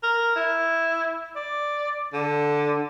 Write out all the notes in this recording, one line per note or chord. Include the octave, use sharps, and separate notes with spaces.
A#4
E4
D5
D3